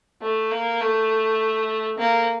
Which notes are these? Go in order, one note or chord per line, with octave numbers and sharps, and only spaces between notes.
A3
A#3
A3
A#3